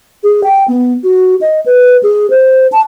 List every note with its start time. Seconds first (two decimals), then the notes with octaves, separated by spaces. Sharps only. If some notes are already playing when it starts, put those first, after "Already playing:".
0.24 G#4
0.44 G5
0.68 B3
1.04 F#4
1.41 D#5
1.66 B4
2.03 G#4
2.30 C5
2.72 A5